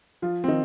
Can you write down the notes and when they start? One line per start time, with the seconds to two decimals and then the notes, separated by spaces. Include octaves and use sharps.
0.22 F3 F4
0.44 C4
0.48 D#3 D#4